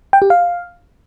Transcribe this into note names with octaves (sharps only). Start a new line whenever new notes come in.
G5
G4
F5